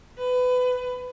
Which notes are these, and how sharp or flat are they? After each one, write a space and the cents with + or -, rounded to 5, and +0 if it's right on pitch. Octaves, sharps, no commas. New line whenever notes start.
B4 +20